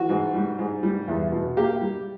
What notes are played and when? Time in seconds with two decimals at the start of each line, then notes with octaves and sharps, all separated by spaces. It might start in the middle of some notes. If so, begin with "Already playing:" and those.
Already playing: E3 F#4
0.09 G#2
0.34 G3
0.59 G#2
0.83 G3
1.08 E2
1.32 B2
1.57 A#3 G4
1.81 G3